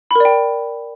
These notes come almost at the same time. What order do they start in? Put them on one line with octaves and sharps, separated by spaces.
B5 A#4 D5 G5